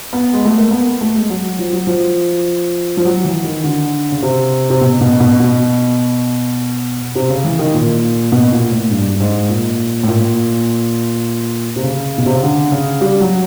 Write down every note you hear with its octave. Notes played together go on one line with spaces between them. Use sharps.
B3
G#3
A3
A#3
B3
A3
G#3
F#3
F3
F#3
F3
F3
F#3
E3
D#3
D3
C#3
C3
C3
B2
B2
B2
B2
C3
C#3
E3
D#3
A#2
B2
A#2
A2
G2
G2
G#2
A#2
A2
A#2
C3
C#3
B2
C3
C#3
D3
C#3
G3
F#3